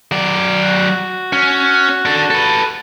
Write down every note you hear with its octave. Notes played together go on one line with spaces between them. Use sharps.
F#3 D5
F#4
C#4
D4 A4
A4 B4